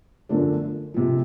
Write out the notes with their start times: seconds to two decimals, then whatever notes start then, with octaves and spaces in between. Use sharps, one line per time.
0.29 F#2 D3 F3 A3 D4
0.94 C#2 C3 F3